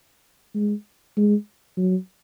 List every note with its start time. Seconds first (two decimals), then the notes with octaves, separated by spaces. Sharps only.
0.55 G#3
1.17 G#3
1.77 F#3